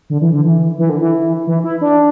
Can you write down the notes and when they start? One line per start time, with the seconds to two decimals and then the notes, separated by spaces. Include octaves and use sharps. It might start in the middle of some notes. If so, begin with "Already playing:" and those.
0.10 D3
0.21 E3
0.33 D3
0.44 E3
0.78 E3
0.89 D3
1.01 E3
1.47 E3
1.64 E4
1.81 D4